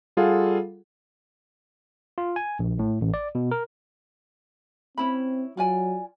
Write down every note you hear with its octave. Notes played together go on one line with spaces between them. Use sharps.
G3 F4 G#4 A4 F5 F#5
F4
G#5
A#1
A2
A1
D5
B2
A#4
C4 C#4 E4 B5
F#3 F4 D5 G#5